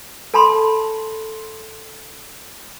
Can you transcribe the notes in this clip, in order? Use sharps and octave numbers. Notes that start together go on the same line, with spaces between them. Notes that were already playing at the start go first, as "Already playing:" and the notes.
A4 A5 B5 C6